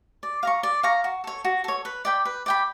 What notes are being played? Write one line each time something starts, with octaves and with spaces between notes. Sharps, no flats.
D5
F5 A#5 C#6
D5
F5 A#5 C#6
F#4
A4 C#5
F#4
A4 C#5
B4
D5 G5 B5
B4
D5 G5 B5